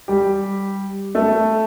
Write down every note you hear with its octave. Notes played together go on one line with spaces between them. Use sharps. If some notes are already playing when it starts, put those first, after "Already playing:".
G3 G4
A3 A4